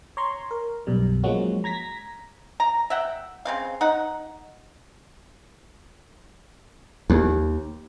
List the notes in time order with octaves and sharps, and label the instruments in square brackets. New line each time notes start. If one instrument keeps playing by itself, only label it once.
[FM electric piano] C#5 A#5 C6 C#6
A#4
B1 F#2 B2 G3
F3 F#3 G#3 A#3 C#4 F#4
A#5 G#6 A#6 B6
[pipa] A#5
E5 F#5 G5
C#3 C4 F5
D#4 F#5
[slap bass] D#2